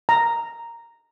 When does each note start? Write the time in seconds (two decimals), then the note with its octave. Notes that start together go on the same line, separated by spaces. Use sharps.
0.09 A#5